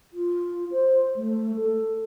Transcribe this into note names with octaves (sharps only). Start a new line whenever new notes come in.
F4
C5
A3
A4